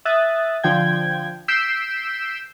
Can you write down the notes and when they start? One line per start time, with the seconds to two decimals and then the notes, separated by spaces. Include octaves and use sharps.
0.05 E5 D#6 F#6 A6
0.64 D3 F3 G5 G#6
1.48 E6 G6 B6 C7 D7 E7